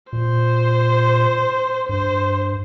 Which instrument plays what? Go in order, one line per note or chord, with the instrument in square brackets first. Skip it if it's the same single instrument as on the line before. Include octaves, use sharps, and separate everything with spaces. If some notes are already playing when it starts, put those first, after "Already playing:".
[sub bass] A#2 [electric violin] C5
[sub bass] G2 [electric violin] C5